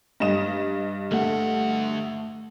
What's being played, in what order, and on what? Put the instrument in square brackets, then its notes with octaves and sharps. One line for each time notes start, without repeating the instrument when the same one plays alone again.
[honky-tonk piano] G2 D#5 E7
[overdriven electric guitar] D2 F#5 [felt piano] A3